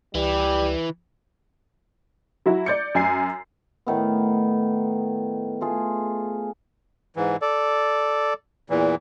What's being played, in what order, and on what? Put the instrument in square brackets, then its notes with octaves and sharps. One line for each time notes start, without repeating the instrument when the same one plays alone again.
[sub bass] C#2 [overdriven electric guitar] E3 [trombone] G3
[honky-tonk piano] F#3 E4 F#4
D5 G6 C#7
F#2 G#5 C7
[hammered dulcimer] A2 D#3 B3
A3 F4 G#4
[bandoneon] G#2 E3
A4 D5
E2 A#2 E3